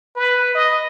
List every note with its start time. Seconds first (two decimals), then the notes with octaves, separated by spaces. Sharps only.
0.16 B4
0.55 D#5